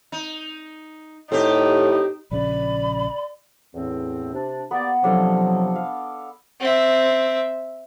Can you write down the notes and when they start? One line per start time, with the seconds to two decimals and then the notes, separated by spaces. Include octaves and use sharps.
0.12 D#4
1.31 A2 C4 D#4 G4
2.31 A#1 C#3 D5 B5
3.75 E2 A2 C4
4.34 C3 D4
4.71 A#3 B3 G4 D5
5.04 C3 F3 F#3 D4 A4 F5
5.75 F5
6.60 C4 E5